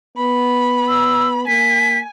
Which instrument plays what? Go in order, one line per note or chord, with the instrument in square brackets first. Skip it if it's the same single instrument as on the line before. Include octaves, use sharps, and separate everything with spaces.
[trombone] B3 [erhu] B5
[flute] E6
[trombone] A#3 [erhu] G#5 [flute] B6